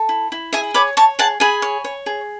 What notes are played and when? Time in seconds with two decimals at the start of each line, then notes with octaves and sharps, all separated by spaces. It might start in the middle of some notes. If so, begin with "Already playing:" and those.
Already playing: A4
0.09 E4
0.32 E4
0.53 G#4 E5 G#5
0.74 C#5 B5 D6
0.97 C#5 A5 C#6
1.19 G#4 F#5 A5
1.40 G#4 G#5 B5
1.62 C#5
1.84 C#5
2.06 G#4